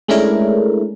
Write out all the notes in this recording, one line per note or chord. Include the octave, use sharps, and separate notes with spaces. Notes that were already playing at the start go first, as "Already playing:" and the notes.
G#3 A3 C#4 D4 E4 A#4